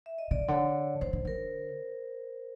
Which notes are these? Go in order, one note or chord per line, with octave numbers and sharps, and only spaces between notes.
E5
D#5
C#3 D5
D3 C#5
D3 C5
D3
D3 A#4